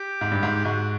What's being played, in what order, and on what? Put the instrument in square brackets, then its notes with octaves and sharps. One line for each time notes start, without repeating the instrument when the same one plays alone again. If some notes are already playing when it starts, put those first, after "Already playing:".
Already playing: [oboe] G4
[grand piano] G#2
G2
G#2
[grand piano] G#2 [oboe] F#4